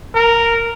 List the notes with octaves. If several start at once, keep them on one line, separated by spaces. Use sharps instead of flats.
A#4